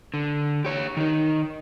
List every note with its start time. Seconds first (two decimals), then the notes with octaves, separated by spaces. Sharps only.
0.14 D3
0.65 G4 C#5
0.97 D#3 D#4